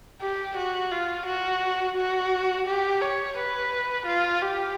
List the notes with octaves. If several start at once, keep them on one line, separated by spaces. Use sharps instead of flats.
G4
F#4
F4
F#4
F#4
G4
C#5
B4
F4
G4